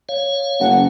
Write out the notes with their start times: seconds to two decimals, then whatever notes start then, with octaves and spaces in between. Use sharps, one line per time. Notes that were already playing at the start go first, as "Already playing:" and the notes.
0.09 C#5 F5
0.60 F#1 F#5